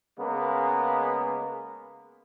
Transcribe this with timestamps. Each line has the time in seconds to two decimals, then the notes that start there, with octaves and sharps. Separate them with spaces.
0.18 C#3 G#3 A#3 B3